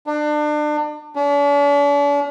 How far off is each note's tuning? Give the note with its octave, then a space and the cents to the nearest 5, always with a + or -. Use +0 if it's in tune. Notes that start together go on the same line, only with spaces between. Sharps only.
D4 +30
D4 -45